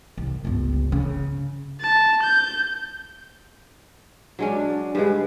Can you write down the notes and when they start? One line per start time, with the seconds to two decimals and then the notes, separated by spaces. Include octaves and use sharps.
0.17 C2
0.45 G1 C#2
0.92 C#3
1.81 A5
2.22 G6
4.39 F#3 G#3 C#4 D4
4.95 G2 C#3 G#3 B4